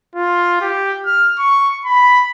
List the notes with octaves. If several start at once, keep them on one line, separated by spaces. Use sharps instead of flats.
F4
G4
F6
C#6
B5